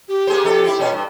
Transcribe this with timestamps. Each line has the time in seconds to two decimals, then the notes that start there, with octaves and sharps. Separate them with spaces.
0.08 G4
0.27 A#3 G#4 C5
0.44 F2 C3 A4
0.64 C4 E4
0.79 A#2 C#4
0.92 G2